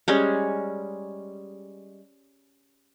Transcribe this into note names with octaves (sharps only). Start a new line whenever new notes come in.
G3 G#3 C#4